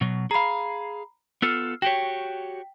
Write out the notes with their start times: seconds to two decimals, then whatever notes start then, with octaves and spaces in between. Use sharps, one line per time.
0.01 B2 F#3
0.31 G#4 F5 A#5 B5
1.42 B3 F4 A4 E6 F6 C7
1.82 F#4 G4 C#5 G5 B6